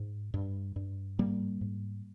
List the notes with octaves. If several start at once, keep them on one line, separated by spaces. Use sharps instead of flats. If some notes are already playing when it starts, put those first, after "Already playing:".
Already playing: G#2
G2
G2
G#2 G3 A#3
G#2